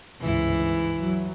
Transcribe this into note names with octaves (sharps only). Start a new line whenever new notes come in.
G1 C#2 G#2 E3 E4
F#3